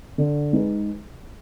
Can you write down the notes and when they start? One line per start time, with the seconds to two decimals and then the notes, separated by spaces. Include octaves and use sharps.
0.18 D3
0.53 G#3 D#4 G#4 B4